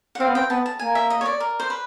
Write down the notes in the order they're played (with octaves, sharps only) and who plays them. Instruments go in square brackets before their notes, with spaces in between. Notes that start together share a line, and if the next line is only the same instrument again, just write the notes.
[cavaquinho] F#5
[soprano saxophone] C4 [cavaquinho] F5
[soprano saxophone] B3
[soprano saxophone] C4 [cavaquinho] G5
[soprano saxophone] B3 [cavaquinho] A5
[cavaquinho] A5
[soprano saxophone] A#3 [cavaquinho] G#5
[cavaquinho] E5
D#5
C#5
D5
A#4
C5
B4